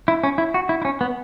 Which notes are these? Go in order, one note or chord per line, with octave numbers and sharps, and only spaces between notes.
E4
C#4
E4
F#4
E4
E4
C#4
B3